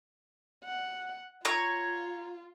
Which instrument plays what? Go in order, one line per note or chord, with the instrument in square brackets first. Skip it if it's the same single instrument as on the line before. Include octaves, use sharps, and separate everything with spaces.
[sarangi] F#5
[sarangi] F4 [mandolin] C#5 A#5